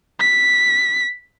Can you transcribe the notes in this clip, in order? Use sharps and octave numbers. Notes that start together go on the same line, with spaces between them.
B6